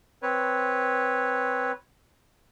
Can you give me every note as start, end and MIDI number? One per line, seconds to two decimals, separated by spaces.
0.23 1.72 60
0.23 1.72 71
0.23 1.72 73